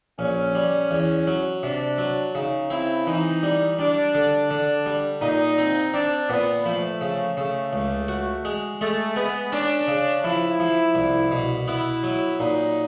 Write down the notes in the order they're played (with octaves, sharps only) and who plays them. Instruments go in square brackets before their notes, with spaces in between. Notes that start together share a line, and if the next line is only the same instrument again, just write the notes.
[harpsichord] A#1 [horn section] C#4
[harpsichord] G3
E2
F#3
[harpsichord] C3 [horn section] D4
[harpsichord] F#3
[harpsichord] C#3 [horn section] D#4
[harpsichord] C4 [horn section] E4
[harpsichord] E3 [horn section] D#4
[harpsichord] G3
[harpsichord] G3 [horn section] D4
[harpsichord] D3
D3
G3
[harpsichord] A#2 [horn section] D#4
[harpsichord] C4
[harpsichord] C4 [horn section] D4
[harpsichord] A#2 [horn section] B3
[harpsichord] F3 [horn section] A3
[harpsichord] C#3
[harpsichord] C#3 [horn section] A3
[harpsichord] C#2
F#4
G#3
[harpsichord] G#3 [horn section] A3
[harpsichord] G#3 [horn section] B3
[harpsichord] C#4 [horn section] D4
[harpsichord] C#3
[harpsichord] F3 [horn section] E4
[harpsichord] F3
C2
B2
[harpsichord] B3 [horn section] E4
[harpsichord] F#3
[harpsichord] A#2 [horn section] D#4